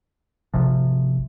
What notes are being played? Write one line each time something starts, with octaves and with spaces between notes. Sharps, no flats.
G#1 C3 F3